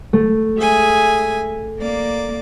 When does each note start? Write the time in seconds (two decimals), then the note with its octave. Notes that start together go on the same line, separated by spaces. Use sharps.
0.13 A3
0.58 G#4 E5 G#5
1.77 A#3 D5